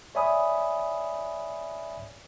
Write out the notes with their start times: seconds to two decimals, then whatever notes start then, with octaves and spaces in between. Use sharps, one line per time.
0.15 C#5 D5 E5 G#5 B5 D#6